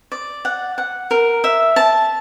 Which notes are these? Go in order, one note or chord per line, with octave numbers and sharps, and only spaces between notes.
D5
F#5
F#5
A#4
E5
A5